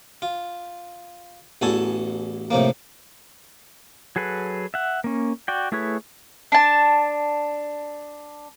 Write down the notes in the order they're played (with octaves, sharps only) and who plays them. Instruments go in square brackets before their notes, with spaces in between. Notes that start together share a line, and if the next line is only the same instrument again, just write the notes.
[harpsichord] F4
A1 E2 F#4 A4 G#5 A5
A2 C3 F3 A#3
[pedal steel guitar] F#3 G#4 A4 B4
E5 F#5
A#3 C#4
F#4 D5 G5
A3 E4 G#4 B4 C#5
[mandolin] D4 A5